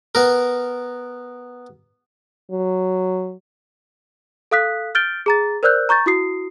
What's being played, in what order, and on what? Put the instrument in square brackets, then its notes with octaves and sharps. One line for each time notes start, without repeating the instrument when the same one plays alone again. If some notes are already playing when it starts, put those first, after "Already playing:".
[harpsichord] B3 A#4
[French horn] F#3
[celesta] A4 F5 D#6 F#6 B6
F6 G6 A6 D7 G7
G#4 A#5 A6
A#4 C5 D5 E6 F#6 G6
A#5 C#6 G6 A6
E4 F#4 D#6 C7